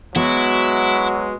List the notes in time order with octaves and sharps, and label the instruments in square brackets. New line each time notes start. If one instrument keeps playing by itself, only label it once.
[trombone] F#3 [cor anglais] G#3 [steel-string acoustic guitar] B3 F#4 [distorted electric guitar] E4